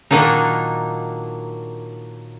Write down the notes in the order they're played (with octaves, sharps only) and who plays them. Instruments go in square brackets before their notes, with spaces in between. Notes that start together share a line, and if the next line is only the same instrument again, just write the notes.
[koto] A#2 D#3 F#3 A#3 D4 D#4